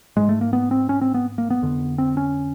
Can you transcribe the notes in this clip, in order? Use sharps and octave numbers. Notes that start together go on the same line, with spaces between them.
G#2 G#3
A3
A#3
B3
C4
C#4
C4
B3
A#3
B3
F2 D3
C4
C#4